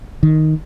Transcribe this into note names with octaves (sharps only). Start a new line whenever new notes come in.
D#3